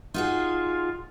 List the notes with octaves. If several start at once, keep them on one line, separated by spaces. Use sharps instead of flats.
D#4 F4 F#4 G#4